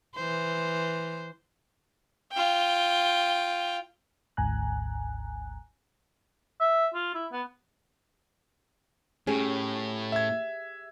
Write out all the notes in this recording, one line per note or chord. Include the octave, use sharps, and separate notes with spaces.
E3 C5
F4 G5
G#1 D2 G#2 G#5 A#5 F#6
E5
F4
E4
B3
A2 C#4 G4 G#4
E5 G#6